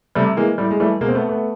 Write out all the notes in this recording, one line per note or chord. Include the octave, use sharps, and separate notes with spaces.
C3 G3 A3
E3 G#3 A#3
A2 G3
G#3
E3 G3 A3
B2 G#3 A#3
C4
A3 B3
A3 B3